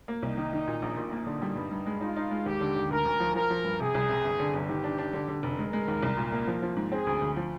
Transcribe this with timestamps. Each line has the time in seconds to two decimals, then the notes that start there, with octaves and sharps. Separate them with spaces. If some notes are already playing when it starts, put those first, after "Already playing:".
0.08 A#3
0.23 C2 D#4
0.37 D#3
0.53 D#3
0.67 A#2
0.82 A#1
0.97 A#2
1.12 A#3 D#4
1.26 D3
1.42 G3
1.56 G2
1.71 G2
1.86 G#3
2.01 D#4 F4
2.16 D#4
2.31 G#3
2.46 D#2 G4
2.60 D3
2.76 D#2
2.90 D2 A#4
3.05 D2
3.20 F3
3.35 F3 A#4
3.50 F3
3.64 G2
3.80 C3 G#4
3.95 C2
4.09 C3
4.24 G1
4.39 D3
4.53 G1
4.69 D#3 G4
4.84 D4
4.98 D4
5.13 D3
5.28 D3
5.43 F1
5.58 G#3 A#4
5.73 G#3
5.88 D#2
6.03 C2
6.17 A#2
6.32 A#3
6.47 F3
6.62 F3
6.76 G#2
6.91 C4 G#4
7.07 D2
7.22 D2
7.36 F3